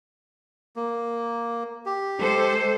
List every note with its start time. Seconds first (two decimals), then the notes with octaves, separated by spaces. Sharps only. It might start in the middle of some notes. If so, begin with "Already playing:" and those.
0.76 A#3
1.86 G4
2.20 G#3 A4 C5